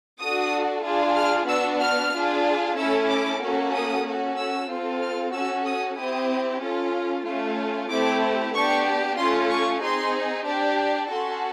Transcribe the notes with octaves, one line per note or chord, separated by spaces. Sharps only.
D4 F#4 A4 D#6
D4 F4 G#4
F6
B3 D4 F#4 E6
F6
D4 F4 G#4
A3 C#4 E4 A4 E6
D6
A#3 C#4 F#4 A4
D#6
C#4 F#4 A4
E6
C4 F4 A4
F6
C#4 F#4 A4 E6
D#6
C4 E4 G4 D#6
C#4 F4 A4
A3 C#4 F4
A3 C4 E4 G4 D6
B3 D4 G4 C#6
A3 C#4 F4 C6
C#6
C4 D#4 G#4 C6
D4 G4
C#4 F#4 A4 C6